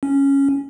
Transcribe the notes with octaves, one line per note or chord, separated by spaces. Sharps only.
C#4